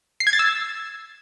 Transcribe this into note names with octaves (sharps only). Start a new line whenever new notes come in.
C7
G#6
A6
E6